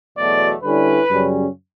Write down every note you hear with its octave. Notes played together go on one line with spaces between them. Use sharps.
E2 B2 F#3 A3 D5
D3 G3 C#4 E4 B4
F#2 C#3 G3 C#4